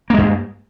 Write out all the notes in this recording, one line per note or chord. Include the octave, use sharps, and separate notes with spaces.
G2 G#3 A#3